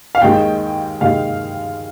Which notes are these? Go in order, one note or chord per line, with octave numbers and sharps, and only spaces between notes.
F5
D#2 D#3 G#3 G5
D#2 D#3 G#3 F5